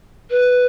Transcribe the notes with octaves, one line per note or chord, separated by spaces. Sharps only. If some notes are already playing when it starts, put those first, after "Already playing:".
B4